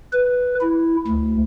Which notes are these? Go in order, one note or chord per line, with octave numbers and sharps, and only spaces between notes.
B4
E4
D2